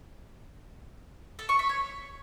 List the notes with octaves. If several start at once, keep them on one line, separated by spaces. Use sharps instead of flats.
A4
C#6
E5
C#5